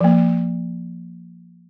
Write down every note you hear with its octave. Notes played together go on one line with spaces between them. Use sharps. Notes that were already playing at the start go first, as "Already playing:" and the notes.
F3 A#3